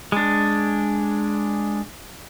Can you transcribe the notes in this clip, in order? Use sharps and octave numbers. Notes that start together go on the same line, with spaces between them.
G#3 D4